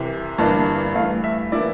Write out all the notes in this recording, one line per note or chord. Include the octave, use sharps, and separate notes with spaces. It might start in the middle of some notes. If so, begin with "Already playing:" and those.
Already playing: C2 C3 E3
G1 G2 E3 A#3 D4 A5
G2 E3 A3 F5
E5
E3 A#3 E4 D5